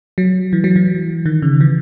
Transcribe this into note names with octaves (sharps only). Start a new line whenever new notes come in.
F#3
E3
F#3
E3
D#3
C#3
E3